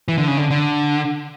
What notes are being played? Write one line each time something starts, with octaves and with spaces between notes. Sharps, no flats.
E3
D3
C#3
D3
D3